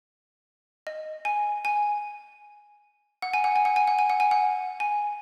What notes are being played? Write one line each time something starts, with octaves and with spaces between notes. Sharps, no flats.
D#5
G#5
G#5
F#5
G#5
F#5
G#5
F#5
G#5
F#5
G#5
F#5
G#5
F#5
G#5